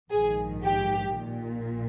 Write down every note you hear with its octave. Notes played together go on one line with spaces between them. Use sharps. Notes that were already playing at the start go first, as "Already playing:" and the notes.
A#1 G#2 D#3 G#4
G4
A#1 A#2